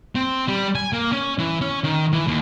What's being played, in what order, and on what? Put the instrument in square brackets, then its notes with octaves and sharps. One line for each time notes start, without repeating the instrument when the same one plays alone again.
[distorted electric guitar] C4
G3
G#5
A#3
C#4
E3
C#4
D#3
E3
D#2